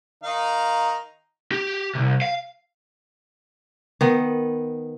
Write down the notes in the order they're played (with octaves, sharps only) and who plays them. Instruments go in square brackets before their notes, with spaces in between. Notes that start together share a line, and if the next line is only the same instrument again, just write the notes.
[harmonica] D#3 D#4 F5
[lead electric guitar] G4
C2 C3
F5
[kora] D#3 B3